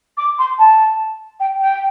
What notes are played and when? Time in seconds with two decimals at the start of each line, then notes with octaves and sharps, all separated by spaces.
0.18 D6
0.39 C6
0.59 A5
1.40 G5
1.61 G5